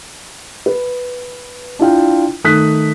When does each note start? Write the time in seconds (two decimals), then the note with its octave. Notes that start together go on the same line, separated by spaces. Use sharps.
0.66 B4
1.79 D4 E4 F4 G5
2.44 D#3 A3 D#6 F#6 B6